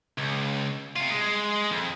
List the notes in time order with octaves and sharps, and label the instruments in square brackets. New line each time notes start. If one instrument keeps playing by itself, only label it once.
[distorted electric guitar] C#2
C3 F4
G#3
F2